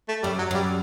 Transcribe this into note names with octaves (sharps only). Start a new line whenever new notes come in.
A3
F#2 G3
F#3
F#2 G3